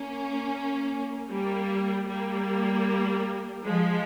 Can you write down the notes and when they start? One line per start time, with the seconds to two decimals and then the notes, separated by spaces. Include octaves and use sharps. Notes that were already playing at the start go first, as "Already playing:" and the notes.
Already playing: A#3 C#4
1.29 G3 A#3
2.08 G3 A#3
3.65 F3 G#3